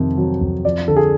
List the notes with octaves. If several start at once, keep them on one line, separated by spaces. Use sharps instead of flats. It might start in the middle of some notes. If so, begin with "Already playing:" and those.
Already playing: F2 C3 D#3
F#3
F2
F3 D5
D3 A4
G#4